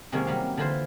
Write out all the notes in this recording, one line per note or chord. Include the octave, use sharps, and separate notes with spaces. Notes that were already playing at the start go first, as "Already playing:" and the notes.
C3 D#3 F#3 G#3 A#3 C#4
F#3 G3 F5
D3 E3 E4 F4 C5